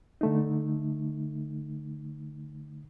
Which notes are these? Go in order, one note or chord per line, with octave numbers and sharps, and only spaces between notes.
D3 A3 D#4